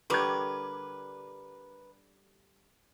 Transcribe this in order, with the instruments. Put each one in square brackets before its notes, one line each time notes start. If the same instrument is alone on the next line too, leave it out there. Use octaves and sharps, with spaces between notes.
[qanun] D3 G3 [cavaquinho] A#4 B4 C#6 [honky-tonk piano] D6 G#6